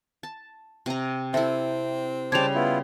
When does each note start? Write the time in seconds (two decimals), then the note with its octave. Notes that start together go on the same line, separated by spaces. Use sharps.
0.23 A5
0.86 C3 A#5
1.34 C4 E4 A4 E5
2.32 C#3 G3 C5 A5 D6 G#6 F7
2.54 B3 E4 F4